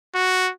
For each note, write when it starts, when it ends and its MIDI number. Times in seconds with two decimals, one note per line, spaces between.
0.15 0.52 66